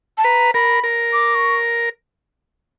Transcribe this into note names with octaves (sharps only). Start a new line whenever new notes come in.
A5
B4 A#5
A#4 B5
A#4
D6
C#6